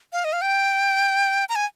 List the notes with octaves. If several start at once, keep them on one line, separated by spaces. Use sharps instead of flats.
F5
D#5
F5
G5
A#5
G#5